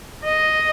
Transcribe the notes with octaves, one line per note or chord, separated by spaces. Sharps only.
D#5